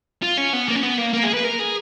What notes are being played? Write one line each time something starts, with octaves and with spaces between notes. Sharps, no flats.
F4
C#4
B3
A#3
C#4
B3
A#3
A#3
G#4
B4
A#4
G#4